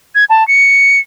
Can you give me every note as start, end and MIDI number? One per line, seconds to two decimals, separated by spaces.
0.15 0.25 92
0.30 0.46 81
0.48 1.00 97